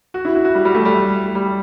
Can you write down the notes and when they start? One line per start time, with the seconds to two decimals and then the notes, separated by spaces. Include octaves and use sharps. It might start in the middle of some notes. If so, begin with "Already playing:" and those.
0.14 F#4
0.25 E4
0.35 F#4
0.45 F#4
0.55 G3
0.65 G3
0.75 A3
0.85 G3
1.35 G3